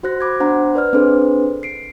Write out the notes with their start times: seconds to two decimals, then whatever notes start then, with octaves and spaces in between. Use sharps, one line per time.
0.03 D#4 F#4 C5 F#6 A#6
0.21 B5 D6 G#6
0.40 B3 D4 C5 F#5 A#5
0.75 B4 D5 F6
0.93 C4 D4 G#4 A4 B4 C5
1.63 C7 D7